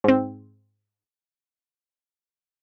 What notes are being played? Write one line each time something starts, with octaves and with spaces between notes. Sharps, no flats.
G#2 C4